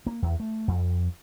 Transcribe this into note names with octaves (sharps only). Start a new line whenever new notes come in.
A#3
E2
A3
F2